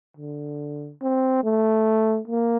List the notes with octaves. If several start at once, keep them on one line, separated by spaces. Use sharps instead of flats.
D3
C4
A3
A#3